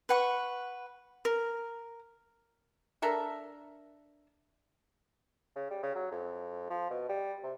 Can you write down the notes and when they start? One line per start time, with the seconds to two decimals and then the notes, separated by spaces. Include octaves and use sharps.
0.09 B4 F#5 C#6
1.25 A#4
3.02 D4 A4 A#4 E5
5.56 C#3
5.71 G3
5.83 C#3
5.95 F#3
6.12 F2
6.70 F3
6.90 B2
7.09 G3
7.43 C3